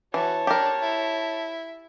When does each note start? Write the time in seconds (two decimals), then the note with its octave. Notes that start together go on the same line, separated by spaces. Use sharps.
0.14 E3 F#4 C#5 A5
0.47 D4 G4 A#4
0.82 E4